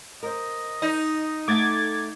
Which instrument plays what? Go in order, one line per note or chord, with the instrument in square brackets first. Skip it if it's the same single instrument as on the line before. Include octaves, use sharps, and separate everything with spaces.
[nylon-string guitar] A#4 C5 [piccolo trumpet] D#5
[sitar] D#4
[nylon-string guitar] A3 A4 F#5 [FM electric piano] D6 G#6 A6